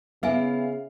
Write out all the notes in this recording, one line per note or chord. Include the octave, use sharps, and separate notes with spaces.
C#3 B3 E4 G#4 E5 F5 G#5